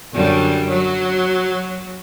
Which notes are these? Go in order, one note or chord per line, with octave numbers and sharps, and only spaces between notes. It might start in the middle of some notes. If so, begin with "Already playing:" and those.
F#2 D3 G3
F#3